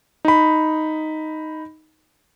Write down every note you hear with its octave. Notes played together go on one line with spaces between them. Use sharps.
D#4 B5